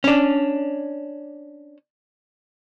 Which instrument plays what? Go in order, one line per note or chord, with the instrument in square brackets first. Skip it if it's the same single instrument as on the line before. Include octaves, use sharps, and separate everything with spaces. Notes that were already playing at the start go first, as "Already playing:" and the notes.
[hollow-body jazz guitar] C#4 D4